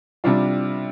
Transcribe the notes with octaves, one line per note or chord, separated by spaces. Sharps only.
C3 G3 D4 F4